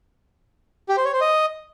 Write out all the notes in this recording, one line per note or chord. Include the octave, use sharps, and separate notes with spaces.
G4
C5
C#5
C5
D#5